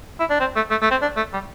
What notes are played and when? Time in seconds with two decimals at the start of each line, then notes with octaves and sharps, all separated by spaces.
0.20 E4
0.30 D4
0.40 C4
0.56 A3
0.71 A3
0.82 A3
0.91 C4
1.02 D4
1.17 A3
1.33 G3